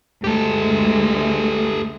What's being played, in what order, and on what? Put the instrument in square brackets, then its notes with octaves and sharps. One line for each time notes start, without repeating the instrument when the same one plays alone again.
[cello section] D2 G#3 A3 [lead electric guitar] G4 A4